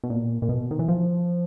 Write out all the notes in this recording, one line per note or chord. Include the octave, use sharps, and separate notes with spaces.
B2
A#2
A#2
B2
D#3
E3
F3